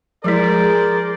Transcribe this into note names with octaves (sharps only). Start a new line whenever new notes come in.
F3 G#3 E4 G#4 A#4 C5 D5